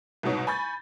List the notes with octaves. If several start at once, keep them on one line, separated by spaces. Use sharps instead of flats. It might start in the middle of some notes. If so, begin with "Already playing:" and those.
C2 G#2 B2 D#4 C#5
G#5 B5 C#6 G6 A6